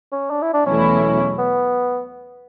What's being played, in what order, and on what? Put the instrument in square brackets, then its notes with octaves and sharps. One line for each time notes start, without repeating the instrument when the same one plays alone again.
[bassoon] C#4
D4
E4
D4
[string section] E2 B2 F#3 A3 E4 [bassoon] C#4
[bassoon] B3